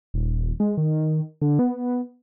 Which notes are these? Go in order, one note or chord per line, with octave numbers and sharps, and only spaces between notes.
D#1
G#3
D#3
D3
B3